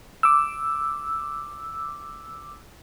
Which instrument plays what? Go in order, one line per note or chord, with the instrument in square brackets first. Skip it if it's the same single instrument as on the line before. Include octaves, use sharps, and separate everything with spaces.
[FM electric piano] D6 E6